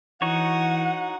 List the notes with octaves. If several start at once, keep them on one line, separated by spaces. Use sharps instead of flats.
E3 D#4 F#4 C#5 F#5